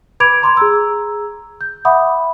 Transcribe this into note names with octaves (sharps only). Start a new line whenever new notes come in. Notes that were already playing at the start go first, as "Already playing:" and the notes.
B4 B5 D6 G#6 D7 F7
A#5 C6 D6 G#6
G#4 A#5 E6
G6
E5 F#5 B5 D6 D#6